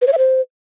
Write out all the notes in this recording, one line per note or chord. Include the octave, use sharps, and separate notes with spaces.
B4
C#5
E5
C5